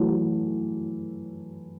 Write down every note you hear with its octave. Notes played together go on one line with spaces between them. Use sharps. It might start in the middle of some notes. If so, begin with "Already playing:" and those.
Already playing: E3 F#3 A3
F#3